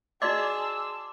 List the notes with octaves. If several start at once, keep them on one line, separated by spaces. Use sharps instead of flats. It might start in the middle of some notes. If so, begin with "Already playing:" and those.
F#4 G#4 D5 D#5 A5 C6 D6 E6